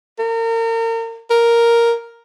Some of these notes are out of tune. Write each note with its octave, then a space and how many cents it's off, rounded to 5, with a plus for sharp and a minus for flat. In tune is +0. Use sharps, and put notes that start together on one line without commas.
A#4 -35
A#4 +0